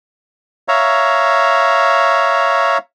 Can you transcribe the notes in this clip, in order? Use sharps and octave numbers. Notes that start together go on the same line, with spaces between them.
C#5 E5 F5 A#5